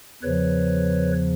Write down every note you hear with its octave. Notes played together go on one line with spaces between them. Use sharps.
E2 C#3 F3 B4 C#5